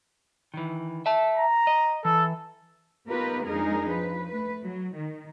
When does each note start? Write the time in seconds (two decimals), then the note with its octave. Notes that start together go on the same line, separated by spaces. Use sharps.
0.54 D#3 E3
1.06 E5 A5
1.37 A#5
1.67 D#5
2.05 E3 A4
3.08 B3 D#4 F4 G4 A#4 B4
3.46 F2 G#3 D4 D#4 G#4 A#4
3.89 F3 B4
4.30 A3 B4
4.63 F#3
4.95 D#3